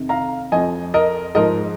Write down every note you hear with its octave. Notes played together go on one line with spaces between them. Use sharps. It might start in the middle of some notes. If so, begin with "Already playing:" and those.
Already playing: F2 C3 D#3
F5 A#5
F2 F3 D#5 G#5
A#4 D#5
G#2 F3 A#4 D#5